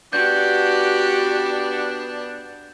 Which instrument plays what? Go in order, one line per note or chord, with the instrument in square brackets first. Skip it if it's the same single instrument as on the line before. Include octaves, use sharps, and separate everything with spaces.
[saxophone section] B3 D4 [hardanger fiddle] F#4 G4 [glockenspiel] G6